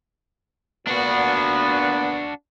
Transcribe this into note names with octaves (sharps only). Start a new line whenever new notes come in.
A#2 B3 D4 F#4